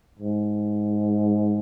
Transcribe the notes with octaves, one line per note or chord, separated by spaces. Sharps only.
G#2